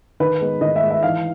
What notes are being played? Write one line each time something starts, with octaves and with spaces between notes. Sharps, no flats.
D#3 B4
G#3 B3
D#3 D#5
E5
G#3 B3
E5
E3 F5